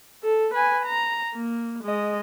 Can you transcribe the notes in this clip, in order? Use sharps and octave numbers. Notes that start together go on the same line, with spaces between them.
A4
B4 G#5
A#5
A#3
G#3 D#5